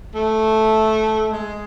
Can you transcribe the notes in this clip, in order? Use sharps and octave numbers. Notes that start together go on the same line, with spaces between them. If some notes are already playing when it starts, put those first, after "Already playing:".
A3
G#3